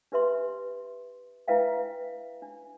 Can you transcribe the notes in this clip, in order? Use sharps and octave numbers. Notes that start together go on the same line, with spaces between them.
D4 G4 B4 E5 C6
D4 E4 B4 E5 F5 G5
D4